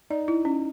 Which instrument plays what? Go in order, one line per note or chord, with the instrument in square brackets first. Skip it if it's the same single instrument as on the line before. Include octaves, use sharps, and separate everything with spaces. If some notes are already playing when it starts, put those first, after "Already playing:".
[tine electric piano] D#4 [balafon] D5
[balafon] E4
C#4